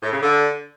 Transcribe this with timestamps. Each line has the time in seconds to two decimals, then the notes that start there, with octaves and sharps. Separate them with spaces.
0.03 A2
0.12 C#3
0.22 D3